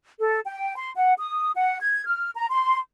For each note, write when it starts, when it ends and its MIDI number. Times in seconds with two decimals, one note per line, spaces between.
0.19 0.40 69
0.45 0.73 79
0.76 0.91 84
0.96 1.14 78
1.18 1.51 87
1.55 1.77 78
1.81 2.04 92
2.06 2.30 89
2.36 2.46 82
2.50 2.78 84